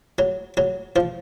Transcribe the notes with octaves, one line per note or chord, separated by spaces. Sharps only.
F#3
F#3
F3